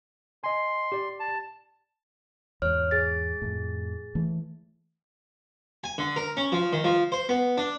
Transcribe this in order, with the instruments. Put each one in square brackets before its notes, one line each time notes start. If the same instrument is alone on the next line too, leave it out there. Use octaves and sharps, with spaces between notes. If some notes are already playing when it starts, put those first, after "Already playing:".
[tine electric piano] D#5 G#5 [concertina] C6
[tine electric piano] G4 D5
[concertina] A5
[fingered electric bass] E2 G#2 [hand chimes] C#5 F6
[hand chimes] G#4 A6
[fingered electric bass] F2 A2
E3 A3
[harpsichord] G#5
D3
A#4
C#4
F3
D#3
F3
C5
B3
D4